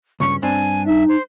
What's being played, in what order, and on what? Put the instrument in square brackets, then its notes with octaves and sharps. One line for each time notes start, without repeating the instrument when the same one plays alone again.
[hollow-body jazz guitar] C#2 G2 C#4 [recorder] C#6
[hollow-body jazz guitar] G2 C4 D4 [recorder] G#5
[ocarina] D#4 [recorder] E5
[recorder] C5